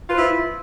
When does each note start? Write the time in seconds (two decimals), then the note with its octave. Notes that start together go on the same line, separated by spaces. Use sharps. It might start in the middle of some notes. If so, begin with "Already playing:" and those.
0.07 F4
0.10 B4
0.13 C5
0.16 E4